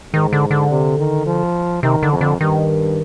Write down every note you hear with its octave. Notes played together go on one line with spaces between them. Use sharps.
G#2 D#3
D3
D3
C3
D#3
F3
C3 D#3
D3
F2
D3
G2 D#3